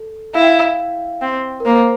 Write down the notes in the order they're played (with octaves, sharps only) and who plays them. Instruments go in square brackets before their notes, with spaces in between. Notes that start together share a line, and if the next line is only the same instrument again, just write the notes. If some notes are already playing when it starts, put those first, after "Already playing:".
Already playing: [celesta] A4
[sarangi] E4 [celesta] F5
[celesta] G5
F5
[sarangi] C4 [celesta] G5
[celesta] A#4
[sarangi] A#3 [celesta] C5